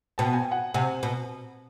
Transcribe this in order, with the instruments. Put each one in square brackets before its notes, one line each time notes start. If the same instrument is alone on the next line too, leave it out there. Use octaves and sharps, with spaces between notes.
[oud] B2 [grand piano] G5 A5
[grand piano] G#5
G5
F#5 G#5
[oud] C3 [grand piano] F#5 G#5
[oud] B2